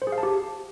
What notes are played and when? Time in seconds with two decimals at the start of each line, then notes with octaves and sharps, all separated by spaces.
0.02 C5
0.07 G#4
0.12 F5
0.18 A5
0.23 G4